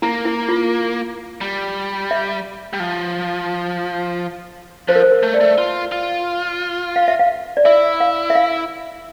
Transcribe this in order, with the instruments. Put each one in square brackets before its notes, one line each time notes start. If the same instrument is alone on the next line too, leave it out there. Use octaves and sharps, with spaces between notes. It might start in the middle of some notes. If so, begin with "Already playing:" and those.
[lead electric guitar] A#3 [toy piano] E4
[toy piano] E4
F4
[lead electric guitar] G3
[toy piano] E5
[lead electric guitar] G3
F3
[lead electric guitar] F3 [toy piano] C5
[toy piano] A#4
C5
A#4
[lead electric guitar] A3
[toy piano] D5
[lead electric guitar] A3
F4
F4
[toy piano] F5
E5
F5
D5
[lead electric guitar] E4 [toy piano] E5
[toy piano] F5
E5
F5